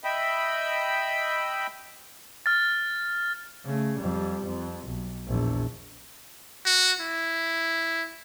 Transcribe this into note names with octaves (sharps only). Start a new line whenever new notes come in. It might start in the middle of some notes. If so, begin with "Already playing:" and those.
D#5 E5 G5 B5
F6 A6
C#3 A3
F2 G3
F2
B1
A#1 E2
F#4
E4